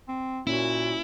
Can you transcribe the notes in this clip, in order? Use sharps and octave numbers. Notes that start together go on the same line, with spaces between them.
C4
A#2 A#3 C#4 E4 F#4